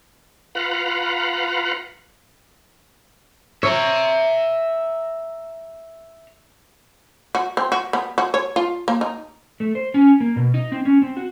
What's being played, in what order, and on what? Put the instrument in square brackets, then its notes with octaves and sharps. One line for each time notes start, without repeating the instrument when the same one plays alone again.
[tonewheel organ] F4 B4 F5 F#5 A#5 B5
[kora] C#5 [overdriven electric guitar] E5 A#5
[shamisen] F#4
C4
F#4
B3
F#4
C#5
F4
A#3
D#4
[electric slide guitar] A3
C5
C#4
A#3
B2
D#4
C4
C#4
C4
F#4